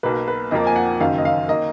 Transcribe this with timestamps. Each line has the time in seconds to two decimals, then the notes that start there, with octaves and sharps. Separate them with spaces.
0.03 B1 B2 A#3 B4
0.28 B4
0.51 F2 F3 A#3 D#5
0.67 G#5
0.76 F#5
1.00 F#1 F#2 D#3 F5
1.18 D#5
1.25 F5
1.48 D#3 A#3 D#5